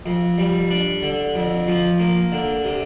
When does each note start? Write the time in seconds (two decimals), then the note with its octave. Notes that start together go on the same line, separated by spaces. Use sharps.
0.06 F2
0.38 G3
0.71 D4
1.03 D3
1.35 F2
1.68 F3
2.00 A#3
2.32 D3
2.64 C3